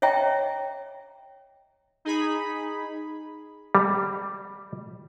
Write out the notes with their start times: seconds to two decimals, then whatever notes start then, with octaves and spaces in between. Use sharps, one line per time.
0.02 C#5 D#5 E5 G5 A#5
2.05 D#4 G#4 B5
3.75 G3